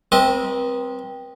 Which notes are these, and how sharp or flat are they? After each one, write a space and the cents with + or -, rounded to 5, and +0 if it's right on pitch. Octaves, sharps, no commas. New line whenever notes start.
C4 +0 B4 -40 D#5 -5